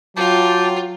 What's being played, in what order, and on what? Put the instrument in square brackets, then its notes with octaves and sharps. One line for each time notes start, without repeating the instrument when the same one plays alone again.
[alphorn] F#3 [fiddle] F4 [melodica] G4 G5 A5